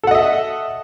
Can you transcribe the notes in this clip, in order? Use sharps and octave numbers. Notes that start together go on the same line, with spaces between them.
A4 D#5 E5 F#5